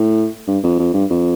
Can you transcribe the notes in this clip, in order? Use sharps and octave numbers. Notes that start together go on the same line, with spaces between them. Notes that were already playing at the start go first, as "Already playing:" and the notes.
Already playing: A2
G2
F2
F2
G2
F2